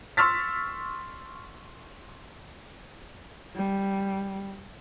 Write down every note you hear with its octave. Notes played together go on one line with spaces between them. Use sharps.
C6 C#6 E6 F6 A6 B6
G3